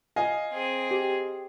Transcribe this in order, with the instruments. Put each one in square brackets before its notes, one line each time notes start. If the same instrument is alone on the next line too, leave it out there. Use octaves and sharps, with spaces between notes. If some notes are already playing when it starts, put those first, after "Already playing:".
[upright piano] D#5 F5 G#5
[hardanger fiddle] C4 G#4
[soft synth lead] G4